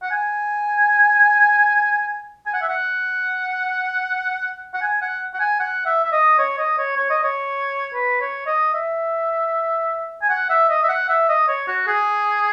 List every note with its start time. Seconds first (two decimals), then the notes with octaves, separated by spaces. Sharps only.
0.02 F#5
0.11 G#5
2.46 G#5
2.54 F#5
2.62 E5
2.68 F#5
4.74 F#5
4.82 G#5
5.02 F#5
5.34 F#5
5.40 G#5
5.60 F#5
5.86 E5
6.04 E5
6.12 D#5
6.39 C#5
6.58 D#5
6.78 C#5
6.96 C#5
7.10 D#5
7.24 C#5
7.94 B4
8.21 C#5
8.47 D#5
8.74 E5
10.22 G#5
10.30 F#5
10.50 E5
10.69 D#5
10.83 E5
10.89 F#5
11.08 E5
11.29 D#5
11.48 C#5
11.68 F#4
11.87 G#4